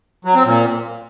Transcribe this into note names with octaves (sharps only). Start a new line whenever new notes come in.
F#3
C4
A#2